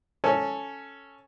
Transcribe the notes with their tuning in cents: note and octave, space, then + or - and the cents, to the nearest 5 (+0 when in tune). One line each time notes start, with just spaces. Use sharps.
C#4 +0 A4 +0